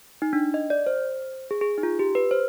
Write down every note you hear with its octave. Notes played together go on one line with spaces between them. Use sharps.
D#4
D4
D#5
D5
C5
G#4
G#4
D#4
F4
G4
B4
C5